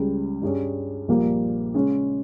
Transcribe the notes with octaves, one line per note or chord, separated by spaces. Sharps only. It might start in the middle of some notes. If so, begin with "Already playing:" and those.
Already playing: C#2 C#3 G3
G2 G3 C#4 G#4
A#1 A#2 G3 A#3
C#3 G#3 C#4